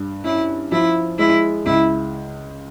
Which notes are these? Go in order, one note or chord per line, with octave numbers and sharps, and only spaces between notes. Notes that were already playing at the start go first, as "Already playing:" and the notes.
Already playing: G2
C#4 E4
F3 E4
G#3 E4
C#2 E4